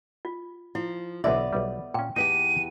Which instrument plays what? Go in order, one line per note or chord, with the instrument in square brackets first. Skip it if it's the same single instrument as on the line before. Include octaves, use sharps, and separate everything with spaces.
[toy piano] F4
[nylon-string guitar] F3 [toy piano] E4
[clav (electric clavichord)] B1 D3 E3 [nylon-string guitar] B3 D5 [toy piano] E5
[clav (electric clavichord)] B1 G3
[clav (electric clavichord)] A#2 C#4 [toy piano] G5
[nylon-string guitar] E2 G4 [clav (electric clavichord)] D#4 B4 E5 [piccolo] D#7